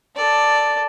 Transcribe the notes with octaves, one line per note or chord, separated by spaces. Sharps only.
A4 D5